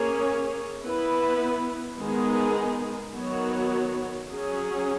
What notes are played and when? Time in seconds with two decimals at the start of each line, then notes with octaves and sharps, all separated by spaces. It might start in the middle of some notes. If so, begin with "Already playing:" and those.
Already playing: A#3 C#4 G#4 C#5
0.83 B3 E4 B4
1.99 D#3 G#3 B3 D#4 G#4
3.15 D#3 F#3 B3 F#4 C#5
4.31 F#3 C#4 G#4